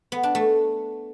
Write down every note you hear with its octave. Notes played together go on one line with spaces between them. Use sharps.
B3
D4
A3